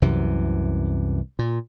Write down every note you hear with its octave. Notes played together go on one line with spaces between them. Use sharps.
C2 F#2 C3 E3
A#2